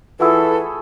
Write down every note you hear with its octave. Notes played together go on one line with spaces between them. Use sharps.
E3 A3 E4 F4 G#4 A4 F#5 E6